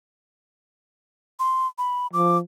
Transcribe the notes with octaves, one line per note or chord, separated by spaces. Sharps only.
C6
B5
F3 D6